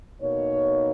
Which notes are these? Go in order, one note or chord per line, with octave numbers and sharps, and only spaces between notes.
B2 A#3 D#4 C#5